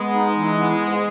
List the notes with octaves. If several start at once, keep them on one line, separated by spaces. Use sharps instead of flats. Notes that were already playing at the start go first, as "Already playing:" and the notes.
Already playing: G#3 B3
D#4
E3
B3
G#2